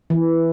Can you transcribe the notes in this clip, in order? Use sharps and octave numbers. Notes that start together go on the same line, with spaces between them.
E3